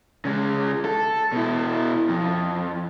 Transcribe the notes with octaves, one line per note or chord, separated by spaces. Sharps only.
C#3 G#3
A4
B2 E4
F2